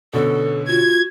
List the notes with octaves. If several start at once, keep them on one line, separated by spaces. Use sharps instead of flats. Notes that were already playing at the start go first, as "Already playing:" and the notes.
B2 D3 C#4 A4
F4 F#4 G#6